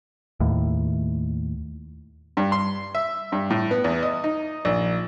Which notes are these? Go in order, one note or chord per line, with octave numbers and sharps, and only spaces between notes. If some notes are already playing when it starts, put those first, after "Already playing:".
D#2 A2
G2
C6
E5
G2
A2
B3
E2
D#5
D#4
A#1